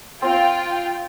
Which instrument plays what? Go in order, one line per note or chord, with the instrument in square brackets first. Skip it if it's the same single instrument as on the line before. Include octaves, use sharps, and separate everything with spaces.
[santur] C4 [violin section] F4 G5